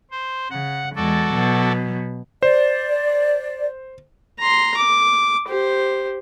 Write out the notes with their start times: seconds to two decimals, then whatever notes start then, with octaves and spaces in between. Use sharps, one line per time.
0.11 C5
0.51 C#3 F#5
0.96 E2 G#3 F#4 A4 D5
1.33 B2 F#3
2.43 C5 D5
4.39 A#5 C6
4.77 D6
5.48 G4 C5